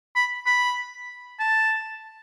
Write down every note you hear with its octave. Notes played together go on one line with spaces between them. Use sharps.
B5
B5
A5